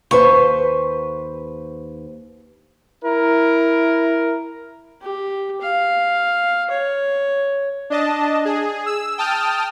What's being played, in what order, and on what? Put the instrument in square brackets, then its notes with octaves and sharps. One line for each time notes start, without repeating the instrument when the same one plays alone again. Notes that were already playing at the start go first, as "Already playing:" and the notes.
[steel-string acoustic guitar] D#2 B4 C5 [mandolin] C#6
[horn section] E4 A#4
[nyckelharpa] G4
F5
C#5
[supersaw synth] D4 D#5 A5
G#4
E6
G5 A5 D#6 F6